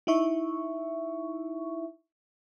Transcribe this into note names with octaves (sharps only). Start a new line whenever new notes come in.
D#4 E4 E5 C#6